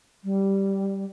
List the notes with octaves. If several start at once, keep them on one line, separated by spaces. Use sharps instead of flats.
G3